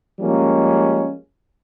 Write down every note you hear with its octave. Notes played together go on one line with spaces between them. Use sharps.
F3 G3 G#3 A#3 C#4